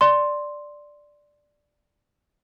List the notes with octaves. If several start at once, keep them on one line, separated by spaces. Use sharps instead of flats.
D5 C6